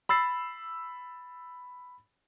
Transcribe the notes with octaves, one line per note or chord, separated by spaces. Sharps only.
B5 E6 A6 C7